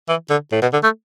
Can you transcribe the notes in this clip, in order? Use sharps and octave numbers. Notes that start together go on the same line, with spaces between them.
E3
D3
A2
B2
D3
A3